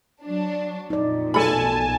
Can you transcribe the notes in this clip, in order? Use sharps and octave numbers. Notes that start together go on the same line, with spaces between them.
F#3 D4
F2 A#2 D#4 D5
B1 A4 G#5 A5 B5